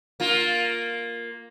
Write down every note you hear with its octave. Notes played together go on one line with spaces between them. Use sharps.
A#3 F4